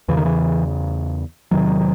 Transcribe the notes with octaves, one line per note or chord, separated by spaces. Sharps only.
E2 C#3 E3
D#3
E3
E2 C3 D#3 F#3